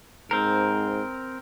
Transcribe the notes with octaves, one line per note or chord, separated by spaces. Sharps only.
G#2 C4 A#4